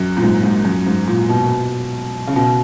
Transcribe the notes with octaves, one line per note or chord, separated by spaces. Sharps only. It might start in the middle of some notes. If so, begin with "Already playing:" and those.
Already playing: F#2
A#2
G#2
G#2
F#2
G#2
A#2
B2
C#3
B2